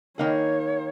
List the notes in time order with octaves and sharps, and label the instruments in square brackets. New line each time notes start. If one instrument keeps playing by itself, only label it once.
[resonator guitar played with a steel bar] D#3 A#3 D#4 G#4 [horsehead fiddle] C#5